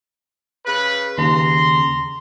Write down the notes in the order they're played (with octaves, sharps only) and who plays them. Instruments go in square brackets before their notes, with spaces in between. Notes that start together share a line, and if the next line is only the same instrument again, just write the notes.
[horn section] C#3 B4
[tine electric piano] D#2 C#3 [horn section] A#5 C6